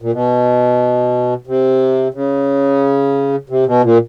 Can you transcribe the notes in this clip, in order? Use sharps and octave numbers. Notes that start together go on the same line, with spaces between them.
A#2
B2
C3
C#3
C3
B2
A#2